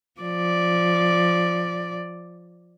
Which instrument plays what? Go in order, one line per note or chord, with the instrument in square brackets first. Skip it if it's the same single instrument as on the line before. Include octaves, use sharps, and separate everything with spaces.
[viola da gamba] F3 D5